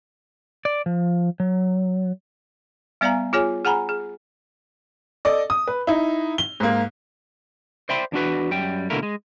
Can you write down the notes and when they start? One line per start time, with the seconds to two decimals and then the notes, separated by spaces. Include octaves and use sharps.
0.65 D5
0.86 F3
1.40 F#3
3.01 G3 B3 D5 F5 G#5 A#5
3.33 F4 G#4 C#5 G#5
3.65 G#4 F#5 G#5 A#5 B5
3.89 G#4
5.25 A4 D5 D#5
5.50 D#6
5.67 B4
5.87 D#4 E4
6.38 G7
6.60 G#2 A#3
7.89 C5 D5 E5 G5 B5 C6
8.12 E2 D4 F#4 B4
8.51 F#2 G3 G5
8.90 B2 D3 A3 A#3 E4 A#4
9.03 G#3